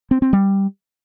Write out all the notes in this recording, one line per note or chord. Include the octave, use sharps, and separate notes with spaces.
C4
C4
G3